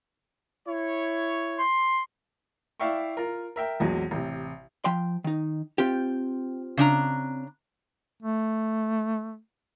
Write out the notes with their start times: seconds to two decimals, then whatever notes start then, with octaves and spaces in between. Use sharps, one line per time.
0.66 E4 C#5
1.59 C6
2.80 E4 D5 E5 F5 G5 C#6
3.17 F4 A#4
3.56 A#4 E5 G5
3.80 A#1 E2 F#3 G#3
4.11 A1 C3
4.85 F3 G5 C6
5.24 D#3 D#4
5.78 C4 F4 G4 G5
6.77 C#3 D4 A#5
8.22 A3